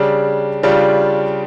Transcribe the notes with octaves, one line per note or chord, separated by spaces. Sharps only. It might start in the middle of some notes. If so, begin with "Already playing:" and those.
Already playing: C#3 G3 D4
C#3 G3 D4 F4